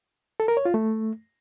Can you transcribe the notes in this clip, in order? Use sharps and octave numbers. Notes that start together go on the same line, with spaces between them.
A4
A#4
C#5
F4
A3